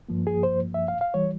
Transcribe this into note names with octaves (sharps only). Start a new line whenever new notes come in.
G2 F3 A#3
G#4
C5
E5
F5
F5
E3 G3 C#5